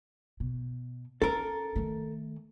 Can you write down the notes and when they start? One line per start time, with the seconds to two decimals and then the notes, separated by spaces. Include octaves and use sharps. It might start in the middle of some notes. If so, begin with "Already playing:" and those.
0.40 B2
1.22 C#4 A4 A#4
1.76 D#3 A3